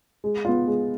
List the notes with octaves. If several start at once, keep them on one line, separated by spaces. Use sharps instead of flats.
G#3
B3 F4
G#3